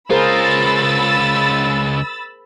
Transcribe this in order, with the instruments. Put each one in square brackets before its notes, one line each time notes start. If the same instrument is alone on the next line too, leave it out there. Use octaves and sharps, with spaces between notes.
[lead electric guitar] C#2 F4 [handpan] G#4 A#4 C5 [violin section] B5 E6 A6